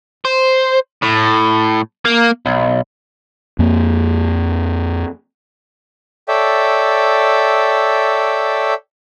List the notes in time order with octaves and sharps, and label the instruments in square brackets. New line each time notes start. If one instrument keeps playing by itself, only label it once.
[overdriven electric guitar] C5
A2
A#3
B1
[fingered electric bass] F2 A#3
[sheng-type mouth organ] A4 C#5 D5 E5 G5